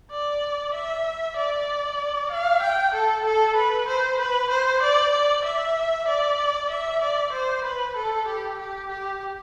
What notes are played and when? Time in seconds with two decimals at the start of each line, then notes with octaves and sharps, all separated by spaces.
0.12 D5
0.74 E5
1.36 D5
2.31 F5
2.62 G5
2.94 A4
3.25 A4
3.56 B4
3.88 C5
4.19 B4
4.50 C5
4.82 D5
5.13 D5
5.45 E5
6.08 D5
6.70 E5
7.02 D5
7.32 C5
7.64 B4
7.96 A4
8.27 G4
8.59 G4
8.89 G4